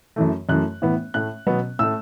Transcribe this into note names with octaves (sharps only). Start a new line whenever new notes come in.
F#2 E3 A3
F#2 E3 A3 F#6
A2 E3 B3
A2 A3 F#6
B2 F#3 B3
A2 A3 E6